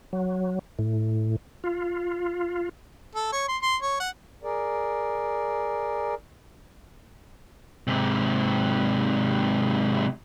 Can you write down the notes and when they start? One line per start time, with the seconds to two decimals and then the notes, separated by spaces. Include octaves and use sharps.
0.13 F#3
0.79 A2
1.64 F4
3.16 A4
3.32 C#5
3.49 C6
3.62 C6
3.82 C#5
4.00 F#5
4.44 G#4 A#4 D5
7.87 G#2 C3